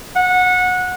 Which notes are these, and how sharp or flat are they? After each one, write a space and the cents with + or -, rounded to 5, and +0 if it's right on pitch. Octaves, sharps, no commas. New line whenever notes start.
F#5 -20